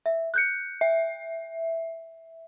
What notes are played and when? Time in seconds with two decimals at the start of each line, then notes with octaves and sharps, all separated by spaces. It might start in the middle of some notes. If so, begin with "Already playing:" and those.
0.06 E5
0.34 F#6 G6 C#7
0.81 E5